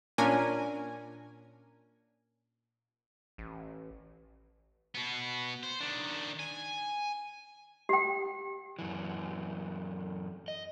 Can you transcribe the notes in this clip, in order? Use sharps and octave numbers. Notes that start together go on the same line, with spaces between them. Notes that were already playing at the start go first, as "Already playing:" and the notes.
A#2 C#4 D4 A#4 G#5
A1
B2 B3
C5
D#3 D4
G#5
G4 G5
F#2 E3
D#5